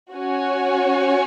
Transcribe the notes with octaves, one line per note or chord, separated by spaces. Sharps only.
C#4 F#4 C#5 G#5